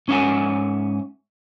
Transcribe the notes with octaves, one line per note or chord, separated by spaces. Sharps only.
G#2 C#4 C#5 E5 F#5 G#5